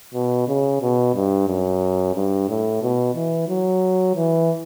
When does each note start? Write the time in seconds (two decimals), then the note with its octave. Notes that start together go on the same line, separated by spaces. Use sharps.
0.14 B2
0.48 C#3
0.82 B2
1.15 G2
1.48 F#2
2.15 G2
2.49 A2
2.82 B2
3.15 E3
3.48 F#3
4.16 E3